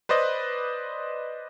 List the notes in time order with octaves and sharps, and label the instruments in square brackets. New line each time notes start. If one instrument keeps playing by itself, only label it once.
[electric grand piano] B4 C5 D5 D#5